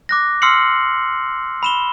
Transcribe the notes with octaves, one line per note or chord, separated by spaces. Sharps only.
D6 F#6 A#6
C6 E6 F6 C7 C#7 F#7
B5 E7 G7